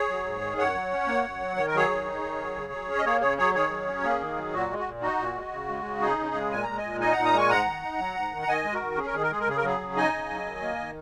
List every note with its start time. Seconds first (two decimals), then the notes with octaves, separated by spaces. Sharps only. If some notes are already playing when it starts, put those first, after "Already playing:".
Already playing: G#4 C#5
0.09 F#3
0.25 G#2
0.41 D#3
0.58 F#2 C#5 F#5
0.75 F#3
0.91 C#4
1.07 A#3
1.24 F#2
1.40 F#3
1.57 D#3 C#5
1.67 A#4
1.74 F#3 G#4 C#5
1.90 D#3
2.06 D#4
2.23 D#3
2.39 F#3
2.55 C#3
2.72 F#3
2.89 C#4
2.98 D#5
3.05 A#3 G#4 C#5
3.21 C#3 G#4 C#5
3.38 F#3 G#4 C#5
3.54 D#3 G#4 C#5
3.70 F#3
3.88 C#4
4.03 A#3 G#4
4.20 D#3
4.36 F#3
4.53 A#2 F#4
4.70 G#3
4.79 F#4
4.86 A#2
5.01 D#4 F#4
5.19 A#2
5.35 G#3
5.52 C#3
5.69 G#3
5.85 C#3
6.01 D#4 G#4
6.19 C#3
6.26 G#4
6.35 G#3
6.51 A#2 G#5
6.63 G#3 A#5
6.77 D#5 G#5
6.83 A#2
7.00 D#4 D#5 G#5
7.12 F#5 A#5
7.17 A#2
7.24 A#5 D#6
7.33 G#3 G#5 C#6
7.49 G#2 F#5 A#5
7.66 D#3
7.83 D#4
7.98 F#3
8.16 G#2
8.32 D#3
8.42 A#5
8.48 D#3 D#5 G#5
8.64 G#3
8.73 F#4 A#4
8.82 D#3
8.98 C#4 G#4
9.06 A#4
9.14 D#3 G#4
9.23 A#4
9.31 G#3 G#4
9.40 A#4
9.47 C#3 G#4
9.57 A#4
9.63 F#3 G#4
9.81 C#3
9.96 D#4 D#5 G#5
10.14 C#3
10.30 F#3
10.46 D#3
10.62 A#3
10.79 D#3